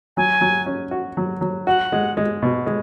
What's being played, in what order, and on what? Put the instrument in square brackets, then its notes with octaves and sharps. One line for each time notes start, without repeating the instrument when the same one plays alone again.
[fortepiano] F#3 [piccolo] G#5
[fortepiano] F#3
C#4
F#4
F#3
F#3
[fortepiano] F#4 [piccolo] F#5
[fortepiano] G#3
G#3
B2
G#3